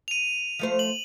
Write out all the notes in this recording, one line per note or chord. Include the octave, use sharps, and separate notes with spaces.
D#7 F7
F3 A3 C5
F#7